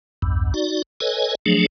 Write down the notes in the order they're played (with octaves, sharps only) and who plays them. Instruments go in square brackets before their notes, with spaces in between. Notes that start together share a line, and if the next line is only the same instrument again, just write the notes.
[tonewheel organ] B1 E2 G2
D#4 F#4 D5
A4 B4 C#5 D#5 G#5
F3 F#3 A3 D4 G#4